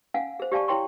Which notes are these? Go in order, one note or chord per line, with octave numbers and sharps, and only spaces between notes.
C#4 F5 F#5 G#5
G#4 C5
G4 D5 F5 G#5 A5 C#6
E4 C#5 G5 C6 C#6